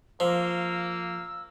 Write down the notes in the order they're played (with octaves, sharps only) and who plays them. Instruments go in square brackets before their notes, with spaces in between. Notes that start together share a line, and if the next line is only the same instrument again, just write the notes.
[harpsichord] F3 [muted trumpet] A#3 [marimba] C5 [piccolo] E6